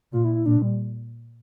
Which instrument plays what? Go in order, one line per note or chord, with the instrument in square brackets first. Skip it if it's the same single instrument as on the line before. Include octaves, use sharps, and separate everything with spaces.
[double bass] A#2 [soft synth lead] F4
[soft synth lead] E4
E4
[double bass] A#2 [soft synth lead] D4
[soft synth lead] G3